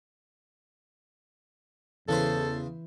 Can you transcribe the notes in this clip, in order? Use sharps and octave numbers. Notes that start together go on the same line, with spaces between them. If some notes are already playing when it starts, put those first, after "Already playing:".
E2 C#3 E3 E4 A4 B4 C5